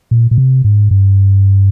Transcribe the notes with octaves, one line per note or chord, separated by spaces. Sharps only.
A#2
A#2
C3
G#2
G2